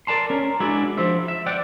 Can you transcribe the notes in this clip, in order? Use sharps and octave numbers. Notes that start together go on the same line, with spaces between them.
A#4 D5 A5 C6
C#4 A#4
G#3 D4 E4 F#4 D5
F3 C5 E5
E5
D5 F#5 G5